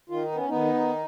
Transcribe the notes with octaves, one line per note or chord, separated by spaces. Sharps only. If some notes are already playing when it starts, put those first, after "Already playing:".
D#3 F4
D#4
B3 C#4
D#3 B3 D#4
D#3